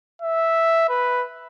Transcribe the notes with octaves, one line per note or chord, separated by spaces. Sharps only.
E5
B4